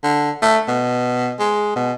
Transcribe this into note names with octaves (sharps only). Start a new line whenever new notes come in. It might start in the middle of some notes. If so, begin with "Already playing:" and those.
D3
A3
B2
G#3
B2